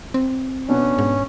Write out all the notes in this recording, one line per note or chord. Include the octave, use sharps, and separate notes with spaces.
C4
B2 B3 C#4 D4
G#2